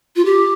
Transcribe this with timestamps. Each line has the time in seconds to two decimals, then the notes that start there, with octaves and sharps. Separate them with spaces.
0.16 F4
0.25 G4